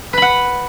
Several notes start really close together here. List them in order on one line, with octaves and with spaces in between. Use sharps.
B4 B5 F#5